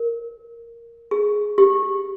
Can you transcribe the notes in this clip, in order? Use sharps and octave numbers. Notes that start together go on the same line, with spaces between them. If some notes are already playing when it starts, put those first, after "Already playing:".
Already playing: A#4
G#4
G4